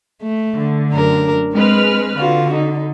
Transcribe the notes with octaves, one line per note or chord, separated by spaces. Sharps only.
A3
D3
F#2 D4 A#4
G#3 C4 B4 F6
D3 F4 F#4
D#4